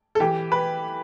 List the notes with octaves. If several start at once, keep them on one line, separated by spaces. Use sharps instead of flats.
A4
E3 G4
B4